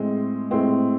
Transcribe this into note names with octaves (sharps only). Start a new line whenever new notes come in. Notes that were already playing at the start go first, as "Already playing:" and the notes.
Already playing: A2 G#3 C4
A2 G#3 C4